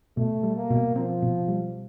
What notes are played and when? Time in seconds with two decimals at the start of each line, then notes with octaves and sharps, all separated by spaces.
0.17 B2 A3
0.43 G3
0.56 A#3
0.70 B2
0.96 F3 C4
1.23 B2
1.48 G3